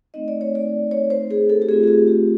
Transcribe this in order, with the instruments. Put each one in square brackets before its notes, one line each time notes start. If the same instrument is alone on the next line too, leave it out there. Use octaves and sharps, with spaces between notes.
[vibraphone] A3 C4 D#4 D#5
D5
C#5
D5
C#5
C5
G#4
A4
G4
A3 C4 F4 G#4
G#4
G4
G4